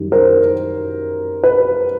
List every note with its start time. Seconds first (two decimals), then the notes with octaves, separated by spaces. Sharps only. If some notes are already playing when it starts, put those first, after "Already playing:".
Already playing: F#2 D#3 G3
0.12 A#4 C5
1.44 B4